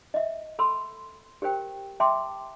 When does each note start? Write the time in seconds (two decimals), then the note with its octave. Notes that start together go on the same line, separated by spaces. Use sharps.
0.14 D#5 E5
0.59 A4 B5 C6 E6
1.42 G4 A#4 C5 G5
2.00 E5 G5 A5 C6 D6